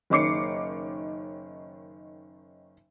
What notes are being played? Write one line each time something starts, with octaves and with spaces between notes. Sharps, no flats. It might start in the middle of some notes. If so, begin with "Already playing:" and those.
F#1 D#3 C#4 D6 C7 C#7